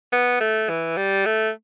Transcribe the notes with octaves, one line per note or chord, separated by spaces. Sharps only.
B3
A3
E3
G3
A3